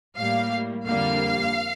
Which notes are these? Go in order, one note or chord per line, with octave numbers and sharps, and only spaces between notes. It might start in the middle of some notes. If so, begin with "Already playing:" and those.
A2 G3 A#3 F5
F2 D3 G3 A#3 F5